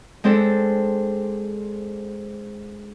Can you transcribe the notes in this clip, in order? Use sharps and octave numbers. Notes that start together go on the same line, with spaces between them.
G#3 C4 D4 A4